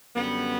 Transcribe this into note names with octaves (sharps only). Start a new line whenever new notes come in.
F#2 D3 G3 B3